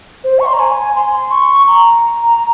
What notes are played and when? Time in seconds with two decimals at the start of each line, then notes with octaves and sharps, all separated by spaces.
0.24 C5
0.39 C#6
0.46 C6
0.53 A#5
0.60 G#5
0.96 C6
1.31 C#6
1.67 A#5